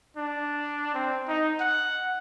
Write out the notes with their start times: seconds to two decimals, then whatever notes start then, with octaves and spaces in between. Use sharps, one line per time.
0.17 D4
0.94 C4
1.28 D#4
1.60 F#5